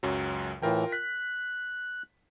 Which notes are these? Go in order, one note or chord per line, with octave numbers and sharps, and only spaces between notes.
C#2 F#2 F#3
A2 E3 F4 A#4 G5
F#6 B6